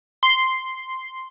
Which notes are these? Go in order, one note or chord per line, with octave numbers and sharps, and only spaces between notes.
C6